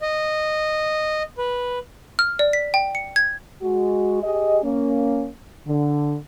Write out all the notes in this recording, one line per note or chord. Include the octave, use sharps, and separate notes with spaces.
D#5
B4
F6
D5
B6
G5
C#7
G#6
G#3 F#4
G4 G#4 D#5
A#3 C#4
D3